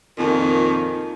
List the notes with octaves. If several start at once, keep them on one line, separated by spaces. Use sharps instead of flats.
F2 A#2 D#3